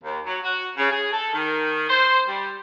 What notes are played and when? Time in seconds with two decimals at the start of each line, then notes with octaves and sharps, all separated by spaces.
0.04 D#2
0.26 F#3
0.43 F#4
0.78 C#3
0.90 G#4
1.13 A4
1.34 D#3
1.89 C5
2.28 G3